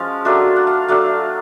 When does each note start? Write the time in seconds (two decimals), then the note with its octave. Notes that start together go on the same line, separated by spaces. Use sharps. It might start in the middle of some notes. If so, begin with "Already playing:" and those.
Already playing: F3 G#3 C#4 F5
0.25 F#3 A3 D4 F4
0.56 F#5
0.67 F5
0.88 F#3 A3 D4 F5